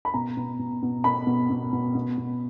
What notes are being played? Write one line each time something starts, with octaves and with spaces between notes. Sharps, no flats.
B5
B2 A#5
B2
B2
B2
B2 B5
B2
B2
B2
B2
B2